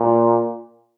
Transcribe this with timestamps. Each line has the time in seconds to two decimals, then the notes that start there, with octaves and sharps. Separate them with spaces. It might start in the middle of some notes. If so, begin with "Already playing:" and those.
Already playing: A#2